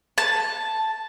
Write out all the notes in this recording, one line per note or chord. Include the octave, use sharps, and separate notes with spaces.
A5